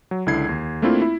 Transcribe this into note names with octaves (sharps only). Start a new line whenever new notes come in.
F#3
C#2 D3 E4 G#6 C7
D#2
A3 A#3 C4 D4 E4 F4
E4